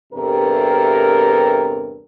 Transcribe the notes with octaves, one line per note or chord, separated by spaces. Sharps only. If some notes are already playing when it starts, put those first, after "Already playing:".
E2 G2 C3 A4 A#4